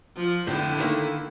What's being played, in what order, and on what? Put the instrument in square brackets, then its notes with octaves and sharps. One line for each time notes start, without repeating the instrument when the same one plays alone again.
[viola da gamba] F3
[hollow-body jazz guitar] F2 A2 [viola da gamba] D3 E4
[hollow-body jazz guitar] D#3 A3 A#3